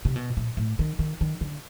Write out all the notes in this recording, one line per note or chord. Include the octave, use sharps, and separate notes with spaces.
C3
B2
A#2
A2
D#3
D#3
D#3
D3